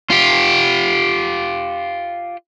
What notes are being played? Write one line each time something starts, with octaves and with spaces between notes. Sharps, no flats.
F4 G4